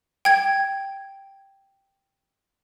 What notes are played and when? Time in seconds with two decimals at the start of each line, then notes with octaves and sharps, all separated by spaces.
0.25 G5 G#6